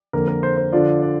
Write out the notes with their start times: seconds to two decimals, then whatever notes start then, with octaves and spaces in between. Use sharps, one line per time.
0.13 F2 D3 A#3 A#4
0.28 A#4
0.43 C5
0.57 C5
0.72 D3 F3 D4 F4 D5
1.02 D5